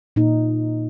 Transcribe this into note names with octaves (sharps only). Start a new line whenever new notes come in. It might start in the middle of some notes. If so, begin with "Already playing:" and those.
A#2 D#4